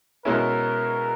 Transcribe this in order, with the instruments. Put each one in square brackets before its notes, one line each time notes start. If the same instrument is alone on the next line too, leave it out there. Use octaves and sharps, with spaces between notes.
[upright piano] B2 G#3 C#4 E4 [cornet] A#4